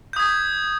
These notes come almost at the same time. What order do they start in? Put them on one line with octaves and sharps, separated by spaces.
G6 D#6 G#6